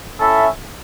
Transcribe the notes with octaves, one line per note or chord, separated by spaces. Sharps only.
C#4 E4 A4 E5